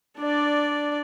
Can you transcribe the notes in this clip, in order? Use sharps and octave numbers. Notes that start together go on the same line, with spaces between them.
D4 D5